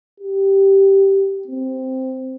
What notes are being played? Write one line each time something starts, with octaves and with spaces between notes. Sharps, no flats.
G4
C4